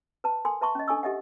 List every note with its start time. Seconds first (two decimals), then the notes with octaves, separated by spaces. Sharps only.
0.24 B4 A5
0.45 A4 A#4 G#5 C6
0.61 B4 E5 A5 C6 C#6
0.75 C#4 D#5
0.88 D4 A4 G#5 C#6 E6
1.03 G4 A4 D#5 E5 F#5